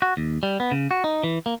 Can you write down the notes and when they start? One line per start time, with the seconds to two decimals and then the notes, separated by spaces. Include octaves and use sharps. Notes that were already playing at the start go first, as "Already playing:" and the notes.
0.02 F#4
0.17 D#2
0.43 G3
0.60 B3
0.72 C#3
0.91 F#4
1.04 D#4
1.24 E3
1.46 A#3